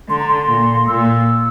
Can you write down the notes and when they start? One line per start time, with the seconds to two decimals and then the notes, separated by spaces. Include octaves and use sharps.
0.09 D3 C6
0.19 A#5
0.28 C6
0.49 A#2
0.88 A#2 E6